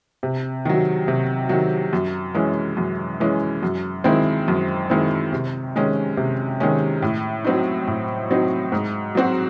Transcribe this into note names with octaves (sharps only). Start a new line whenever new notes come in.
C3
D#3 F#3
C3
D#3 F#3
F#2
E3 G#3 C#4
F#2
E3 G#3 C#4
F#2
D#3 G#3 C4 E4
F#2
D#3 G#3 C4 E4
C3
D#3 G#3 C#4
C3
D#3 G#3 C#4
A2
F#3 C4 D#4
A2
F#3 C4 D#4
G#2
F#3 C4 F#4